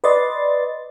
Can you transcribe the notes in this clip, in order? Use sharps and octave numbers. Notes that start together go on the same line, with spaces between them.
B4 D5 D#5 C6 A6